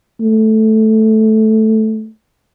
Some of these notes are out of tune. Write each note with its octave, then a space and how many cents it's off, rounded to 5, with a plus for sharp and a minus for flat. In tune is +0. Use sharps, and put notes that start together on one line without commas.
A3 -5